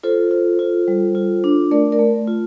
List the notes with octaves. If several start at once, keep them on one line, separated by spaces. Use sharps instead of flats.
F4 A4 C5
F4
F4
G3
F4
D4
A3 A#4 D5
A#4 D5
A3
F4